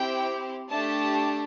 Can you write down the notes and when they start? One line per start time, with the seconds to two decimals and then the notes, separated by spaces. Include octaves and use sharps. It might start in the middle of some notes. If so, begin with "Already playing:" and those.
Already playing: C4 E4 G4 G5
0.69 A3 D4 G4 A5